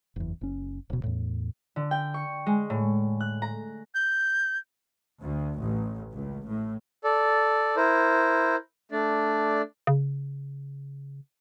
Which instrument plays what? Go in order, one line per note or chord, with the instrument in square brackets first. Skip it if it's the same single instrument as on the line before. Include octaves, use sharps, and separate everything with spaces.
[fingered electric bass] F#1 E2
F#1 C#4
D1 B2
E2 A2
[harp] D3
G5
C#6
G#3
A2
F#6
A#5
[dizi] G6
[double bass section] D2
A1
C#2
A2
[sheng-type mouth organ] A4 D5
E4 A#4 C5
A3 D4 D5
[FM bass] C#3